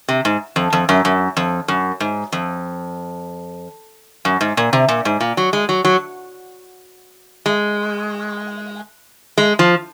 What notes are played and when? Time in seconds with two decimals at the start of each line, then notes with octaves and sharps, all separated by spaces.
0.08 C3
0.25 G#2
0.56 F2
0.73 F2
0.89 F#2
1.05 F#2
1.37 F2
1.68 F#2
2.00 G#2
2.32 F2
4.25 F#2
4.41 G#2
4.57 A#2
4.73 C3
4.88 A#2
5.05 G#2
5.20 A#2
5.37 F#3
5.53 G#3
5.69 F#3
5.85 F#3
7.46 G#3
9.38 G#3
9.59 F3